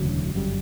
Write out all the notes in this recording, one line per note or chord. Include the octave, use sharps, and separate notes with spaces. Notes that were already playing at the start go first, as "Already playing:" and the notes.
Already playing: E1 D2 C#3 F#3
G1 F#2 D3 G3